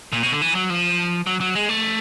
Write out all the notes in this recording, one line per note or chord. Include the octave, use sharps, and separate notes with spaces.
A#2
B2
D3
E3
F#3
F3
F#3
F#3
G#3
A3